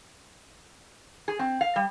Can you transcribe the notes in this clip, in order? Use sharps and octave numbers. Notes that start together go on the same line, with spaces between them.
G#4
C4
F5
G3